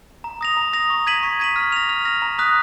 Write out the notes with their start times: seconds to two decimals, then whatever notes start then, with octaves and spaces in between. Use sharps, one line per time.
0.24 A#5
0.41 D#6 A#6 F7
0.57 A#5
0.73 D#6 A#6 F7
0.90 C#6
1.07 G#6 B6 D#7 F#7
1.23 C#6
1.40 G#6 B6 D#7 F#7
1.56 F6
1.72 A#6 F7
1.89 F6
2.05 A#6 F7
2.22 A#5
2.38 D#6 F#6 B6